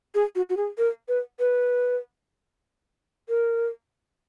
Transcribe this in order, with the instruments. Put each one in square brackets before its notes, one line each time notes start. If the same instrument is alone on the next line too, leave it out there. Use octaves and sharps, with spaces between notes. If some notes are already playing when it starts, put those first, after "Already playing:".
[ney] G#4
F#4
F#4
G#4
A#4
B4
B4
A#4